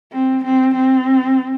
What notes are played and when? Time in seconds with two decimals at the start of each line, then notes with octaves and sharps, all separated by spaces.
0.12 C4
0.44 C4
0.75 C4